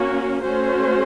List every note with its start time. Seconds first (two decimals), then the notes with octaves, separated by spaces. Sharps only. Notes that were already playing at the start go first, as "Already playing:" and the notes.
Already playing: A#3 C#4 F#4
0.44 A3 C#4 F#4 C5